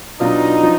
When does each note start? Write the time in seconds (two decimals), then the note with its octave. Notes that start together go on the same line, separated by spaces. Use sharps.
0.20 B2 F#3 D4 D#4 F4
0.63 F3